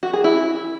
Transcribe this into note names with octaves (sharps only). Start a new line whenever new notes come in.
F#4
G#4
E4